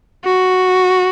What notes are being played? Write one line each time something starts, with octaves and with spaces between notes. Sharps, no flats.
F#4